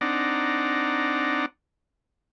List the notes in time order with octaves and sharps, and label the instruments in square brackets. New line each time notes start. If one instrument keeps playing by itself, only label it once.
[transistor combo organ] C4 D4 D#4 D5 F#5 A#5